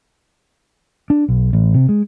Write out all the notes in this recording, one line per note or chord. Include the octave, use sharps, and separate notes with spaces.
D4
B1
A1
C3
G#3